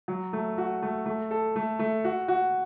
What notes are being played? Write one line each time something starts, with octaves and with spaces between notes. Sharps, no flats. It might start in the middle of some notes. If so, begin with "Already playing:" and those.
F#3
A3
F#4
A3
A3
A4
A3
A3
F#4
F#4